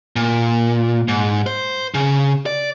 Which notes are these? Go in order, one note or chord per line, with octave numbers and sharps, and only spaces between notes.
A#2
G#2
C5
C#3
D5